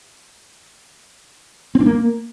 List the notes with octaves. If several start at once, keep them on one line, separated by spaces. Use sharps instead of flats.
C4
D4
A#3